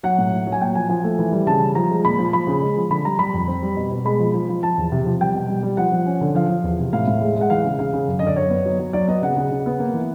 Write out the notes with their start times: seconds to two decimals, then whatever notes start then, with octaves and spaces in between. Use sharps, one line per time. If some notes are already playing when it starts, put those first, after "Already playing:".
0.03 F#3 F#5
0.18 A2
0.33 F#3
0.47 F#3
0.52 G#5
0.61 A#2 G5
0.75 F3 G#5
0.89 F3 G#5
1.04 A3
1.19 E3
1.32 G3
1.47 C#3 A5
1.61 G3
1.75 F3 A#5
1.90 G#3
2.05 A#2 B5
2.19 F3
2.33 F3 B5
2.47 C#3
2.62 G#3
2.77 F3
2.90 D3 B5
3.05 G3 A#5
3.19 G3 B5
3.34 F2
3.48 C4
3.62 G3
3.76 B2
3.92 B2
4.05 G#3 B5
4.19 F3
4.34 F3
4.49 F3
4.63 F3 A5
4.78 E2
4.92 C3
5.06 F3
5.20 G3 G5
5.34 B2
5.49 G3
5.63 G3
5.77 F3 F#5
5.92 F3
6.06 C#4
6.21 D3
6.35 F3 F5
6.49 F3
6.64 E2
6.79 C3
6.93 A2 F5
7.08 A2
7.21 G#3
7.36 G#3 F#5
7.50 E3 F5
7.64 C#3
7.79 C#3 F5
7.93 C#3
8.08 F#2
8.19 D3 D#5
8.27 D5
8.36 F#2 C#5
8.50 B3
8.66 F#3
8.79 F#3
8.93 F#3 D5
9.08 B3 D#5
9.22 C#3 F#5
9.36 C#3
9.51 C#3
9.66 B3
9.79 A#3
9.94 E3